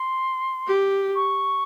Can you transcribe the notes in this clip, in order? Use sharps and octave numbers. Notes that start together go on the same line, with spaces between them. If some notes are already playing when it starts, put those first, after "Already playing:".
Already playing: C6
G4
C#6